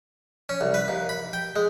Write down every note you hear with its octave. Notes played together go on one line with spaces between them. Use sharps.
C#4
C2
B4
D#2
B5
G5
G#3